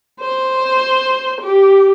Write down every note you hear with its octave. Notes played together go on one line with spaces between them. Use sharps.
C5
G4